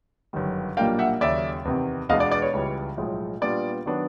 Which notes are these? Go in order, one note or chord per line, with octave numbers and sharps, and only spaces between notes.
G1 F#2 D#3 G3
B1 A#2 G3 A#3 D4 F5 G5
E5 F#5
D#2 C#3 F#3 D5 E5
E2 C3 D#3
E2 B2 G#3 B3 D4 D#5 F5
D5
D5
C#5
C#2 C#3 E3 G3
B1 A2 F3 G#3
A#2 G3 B3 D4 F4 D5
D#3 F#3 B3 D4